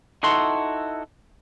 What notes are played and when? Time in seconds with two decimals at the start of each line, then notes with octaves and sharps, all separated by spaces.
0.23 D#4 E4 F#4 A4 C6